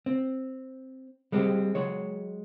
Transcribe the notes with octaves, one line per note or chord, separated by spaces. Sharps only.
C4
G3 G#3 C4 G4
F#3 G#3 C#5